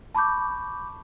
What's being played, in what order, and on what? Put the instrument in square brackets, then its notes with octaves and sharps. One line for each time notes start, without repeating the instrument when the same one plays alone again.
[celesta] A5 B5 C#6 D6 G6